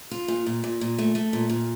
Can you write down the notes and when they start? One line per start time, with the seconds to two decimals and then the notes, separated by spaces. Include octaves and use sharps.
0.11 F4
0.28 A#2
0.46 A#2
0.64 A#2
0.81 A#2
0.98 A3
1.15 A3
1.33 A#2
1.49 A#2